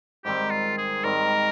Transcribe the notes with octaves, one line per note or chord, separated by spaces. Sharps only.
G#2 D#3 G3 C4 G4
F4
G#4
G#2 D#3 G3 C4 A#4